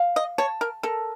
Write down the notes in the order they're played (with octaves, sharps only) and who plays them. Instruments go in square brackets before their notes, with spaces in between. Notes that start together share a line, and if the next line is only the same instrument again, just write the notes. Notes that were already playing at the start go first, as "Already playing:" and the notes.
Already playing: [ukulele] F5
[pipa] D#5
[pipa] C#5 [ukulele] A5
[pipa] A#4
[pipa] A4 [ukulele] A#4